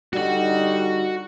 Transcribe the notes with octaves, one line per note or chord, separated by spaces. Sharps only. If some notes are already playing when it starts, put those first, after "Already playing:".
D3 G3 D#4 F#4 F#5